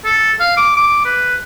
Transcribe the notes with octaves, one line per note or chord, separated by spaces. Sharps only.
A4
F5
D6
D6
B4